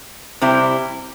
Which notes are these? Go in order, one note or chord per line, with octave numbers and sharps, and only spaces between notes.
C3 G3 C4 E4